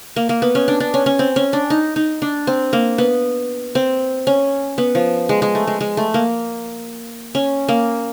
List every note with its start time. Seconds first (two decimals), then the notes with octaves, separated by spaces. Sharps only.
0.16 A#3
0.29 A#3
0.42 B3
0.55 C#4
0.68 D4
0.80 D4
0.94 C#4
1.06 C#4
1.19 C4
1.36 C#4
1.53 D4
1.70 D#4
1.96 D#4
2.22 D4
2.47 C4
2.73 A#3
2.98 B3
3.75 C4
4.27 C#4
4.78 B3
4.95 F3
5.29 G#3
5.42 G#3
5.55 A3
5.67 G#3
5.81 G#3
5.97 A3
6.14 A#3
7.35 C#4
7.69 A#3